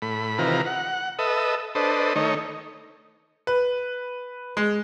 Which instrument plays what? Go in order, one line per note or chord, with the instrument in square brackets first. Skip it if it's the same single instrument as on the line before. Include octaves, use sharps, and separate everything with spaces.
[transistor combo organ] A2 B5
C3 D#3 E3 F4 B4 A#5
F#5
A4 B4 D#5 E5
D4 A4 B4 C5 D#5
D#3 A3 D#4 C#5
[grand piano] B4
G#3